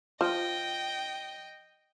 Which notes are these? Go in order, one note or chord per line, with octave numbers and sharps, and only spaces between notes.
F3 D#5 G5